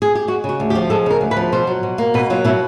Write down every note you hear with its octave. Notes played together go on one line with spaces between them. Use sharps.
G#4
G4
G#3 F#4
C#3 F#4
D2
G4
F3
G#3 A4
C#3 A#4
D2
B4
F3
B2 C5
F#3
B2
A#3
B2 B4
F#3 F4
B2 E4